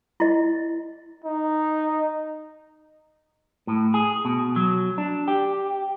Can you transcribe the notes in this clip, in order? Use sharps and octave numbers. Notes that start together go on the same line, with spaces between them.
E4 D#5
D#4
A2
G#4
B2
F#3
D4
G4